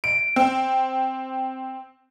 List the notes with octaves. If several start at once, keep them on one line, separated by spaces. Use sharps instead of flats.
D7
C4